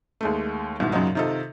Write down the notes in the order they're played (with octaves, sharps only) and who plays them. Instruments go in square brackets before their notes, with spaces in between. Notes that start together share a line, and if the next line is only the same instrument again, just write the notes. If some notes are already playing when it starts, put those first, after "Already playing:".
[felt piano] D#2 G#3 A3
C2 G#2 B2 D#3
F#2 A#2 C#3 F#3 D#4
C3 D#3 D#4 F4 A4